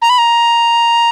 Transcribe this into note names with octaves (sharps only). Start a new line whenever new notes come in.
A#5
B5
A#5